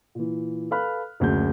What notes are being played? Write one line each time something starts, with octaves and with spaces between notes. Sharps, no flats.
A#2 E3
A4 B4 F5 B5 F6 F#6
F#1 D2 G#4 G6